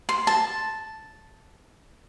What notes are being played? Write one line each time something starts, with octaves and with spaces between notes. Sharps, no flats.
C6
A5